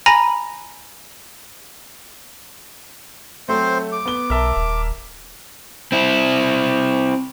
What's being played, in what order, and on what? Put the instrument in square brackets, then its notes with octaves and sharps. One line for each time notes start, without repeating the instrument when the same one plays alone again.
[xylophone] G#5 A#5 B5 A#6
[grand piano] F#3 A3 [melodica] C4 C5
[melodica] D6
[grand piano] B3 G7
[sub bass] B1 [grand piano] A#4 E5 A5
[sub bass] D#1
[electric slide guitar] C4 E4